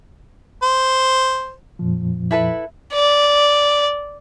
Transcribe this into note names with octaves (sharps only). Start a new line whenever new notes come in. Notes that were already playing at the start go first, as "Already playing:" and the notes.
C5
F2 A#2 F3
E4 A4 B4
D5